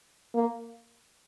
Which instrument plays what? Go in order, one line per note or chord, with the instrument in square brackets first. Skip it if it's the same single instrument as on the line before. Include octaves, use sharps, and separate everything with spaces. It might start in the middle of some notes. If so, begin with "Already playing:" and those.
[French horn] A#3